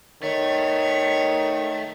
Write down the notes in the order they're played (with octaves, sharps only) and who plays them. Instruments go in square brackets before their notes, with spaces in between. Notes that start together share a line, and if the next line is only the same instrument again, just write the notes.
[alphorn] D#3 [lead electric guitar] A3 [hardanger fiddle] C#5